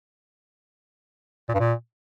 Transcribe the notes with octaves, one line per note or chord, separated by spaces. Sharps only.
A#2
G2
A#2